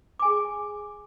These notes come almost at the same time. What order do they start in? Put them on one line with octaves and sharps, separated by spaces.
D6 G#5 G#4